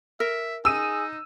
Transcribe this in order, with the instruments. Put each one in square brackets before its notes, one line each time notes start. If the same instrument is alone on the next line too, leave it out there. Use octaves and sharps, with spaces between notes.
[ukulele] A#4 [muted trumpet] E5
[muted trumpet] D#4 [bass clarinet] G#4 [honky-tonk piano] E6 D#7